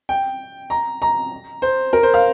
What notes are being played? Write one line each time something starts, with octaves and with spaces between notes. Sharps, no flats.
G5
A#5
A#5
C5
A#4
C5
F5